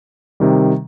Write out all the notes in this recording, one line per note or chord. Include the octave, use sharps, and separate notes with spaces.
C3 D#3 G3